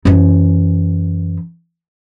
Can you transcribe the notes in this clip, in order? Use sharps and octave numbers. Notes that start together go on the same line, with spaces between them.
F#2 E3